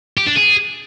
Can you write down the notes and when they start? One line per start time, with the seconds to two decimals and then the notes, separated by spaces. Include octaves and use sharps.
0.17 G4
0.27 D4
0.36 G#4